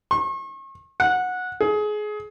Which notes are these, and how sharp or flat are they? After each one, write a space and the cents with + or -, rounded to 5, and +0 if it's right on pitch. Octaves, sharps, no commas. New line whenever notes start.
C#6 -40
F#5 -15
G#4 +25